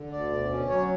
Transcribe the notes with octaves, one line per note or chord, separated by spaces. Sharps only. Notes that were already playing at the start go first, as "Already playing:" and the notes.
Already playing: D3
D2 D5
B2
C#4
F#3 C#5